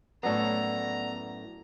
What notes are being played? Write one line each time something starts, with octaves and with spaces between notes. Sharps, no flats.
F#2 A2 B3 A4 D5 F#5 A#5